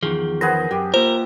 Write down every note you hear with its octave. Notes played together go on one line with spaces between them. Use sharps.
E2 D#3 F3 G#4
B3 G#4 A#4 C5 A#6
F#2 G4
A#3 F4 A#4 C5